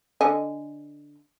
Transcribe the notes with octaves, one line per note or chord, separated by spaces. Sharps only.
D3 D#5 G#5